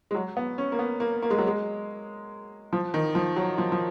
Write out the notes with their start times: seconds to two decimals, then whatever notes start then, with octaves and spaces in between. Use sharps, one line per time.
0.11 G#3
0.15 F#3
0.37 B3
0.58 C#4
0.72 A#3
0.79 B3
1.00 A#3
1.22 A#3
1.30 G#3
1.38 F#3
1.47 G#3
2.73 F3
2.94 D#3
3.15 F3
3.36 F#3
3.58 F3
3.72 F3